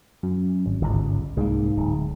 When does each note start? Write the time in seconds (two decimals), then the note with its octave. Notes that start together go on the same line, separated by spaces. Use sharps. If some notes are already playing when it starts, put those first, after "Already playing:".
0.23 F#2
0.66 G#1
0.81 G1 C#2
1.37 C2 G#2 A#3
1.77 D1